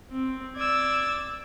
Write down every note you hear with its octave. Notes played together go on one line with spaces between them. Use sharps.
C4
D5 E6 G#6